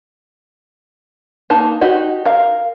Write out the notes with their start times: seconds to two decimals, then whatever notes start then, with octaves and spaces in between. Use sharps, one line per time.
1.50 A#3 D#4 A5
1.81 D#4 F#4 G4
2.25 A#4 F5